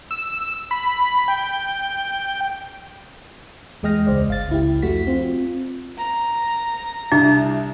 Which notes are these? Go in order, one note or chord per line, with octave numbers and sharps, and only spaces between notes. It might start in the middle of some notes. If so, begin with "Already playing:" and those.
E6
B5
G5
E2 G#3 D#5 G5 F6 A#6
C#2 C5 D5
G1 F5 A6
C#2 E4 G4
F2 A3 F#4 B6
C4 F4
A#5
C2 D4